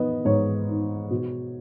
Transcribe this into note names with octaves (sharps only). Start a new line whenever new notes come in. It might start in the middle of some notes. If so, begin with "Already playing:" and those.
Already playing: B3 D#5
G#2 C#5
D#4
B2